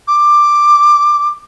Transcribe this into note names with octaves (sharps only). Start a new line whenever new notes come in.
D6